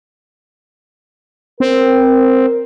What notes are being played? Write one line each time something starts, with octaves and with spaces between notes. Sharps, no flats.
C4 A#4